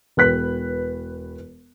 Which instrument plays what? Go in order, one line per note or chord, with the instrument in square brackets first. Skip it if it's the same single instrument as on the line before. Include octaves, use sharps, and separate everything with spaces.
[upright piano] E1 B4 F#6 B6